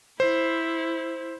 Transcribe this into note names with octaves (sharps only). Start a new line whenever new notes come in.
E4 C5